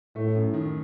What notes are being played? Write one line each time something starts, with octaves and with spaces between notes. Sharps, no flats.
A2 A3
F#2
D#3